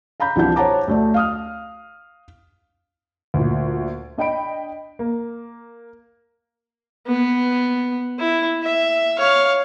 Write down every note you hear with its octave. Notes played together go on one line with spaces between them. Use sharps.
F5 A#5 B5 G6
C2 E3 F3 D4 F#5 G6
C5 C#5 F#5 A5 A#5 D6
D2 A3 D5
F5 D#6 F6
D2 A#2
D4 D#5 G5 B5 D7
A#3
B3
E4
E5
C#5 F5